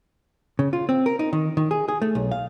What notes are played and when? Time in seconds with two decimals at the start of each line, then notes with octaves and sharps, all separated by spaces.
0.59 C#3
0.73 F4
0.89 C4
1.06 A#4
1.19 D#4
1.33 D#3
1.57 D#3
1.71 G#4
1.88 G#4
2.02 A3
2.15 B1
2.31 F5